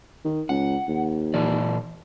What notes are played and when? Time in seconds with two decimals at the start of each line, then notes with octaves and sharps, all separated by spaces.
0.25 D#3
0.49 C#2 F#5
0.88 D#2
1.34 A#2 E3 D5